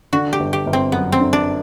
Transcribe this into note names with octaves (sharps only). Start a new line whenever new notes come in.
D3 F#4
G4
G1
G4
G1
C4
F#2 B3
C4
D3
D4